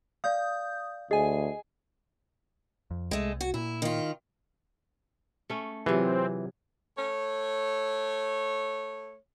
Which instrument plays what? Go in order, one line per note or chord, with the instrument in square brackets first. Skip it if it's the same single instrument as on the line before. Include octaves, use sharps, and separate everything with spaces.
[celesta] D5 F5 [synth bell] D#6 G6
[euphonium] D2 [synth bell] G#4 G#5 [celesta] D#5
[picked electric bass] F2
[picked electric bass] C2 [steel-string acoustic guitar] G#3 A3
[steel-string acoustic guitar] F#4
[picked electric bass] A#2 [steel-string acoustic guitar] E4
[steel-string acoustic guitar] D#3 F4
[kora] A3 C#4
[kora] C3 G#4 [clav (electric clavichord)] E3 [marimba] F#3 F4 C#5 [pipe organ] C4
[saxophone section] A3 C#5